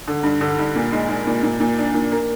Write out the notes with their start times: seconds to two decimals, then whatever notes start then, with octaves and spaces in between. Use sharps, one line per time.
0.08 D3
0.23 G2
0.41 D3
0.59 G2
0.76 A#2
0.92 G#3
1.09 G#3
1.27 A#2
1.43 A#2
1.60 A#2
1.78 D4
1.94 A#2
2.12 A#3